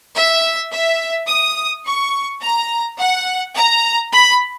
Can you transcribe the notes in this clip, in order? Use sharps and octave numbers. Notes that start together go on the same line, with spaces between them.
E5
E5
D#6
C#6
A#5
F#5
A#5
B5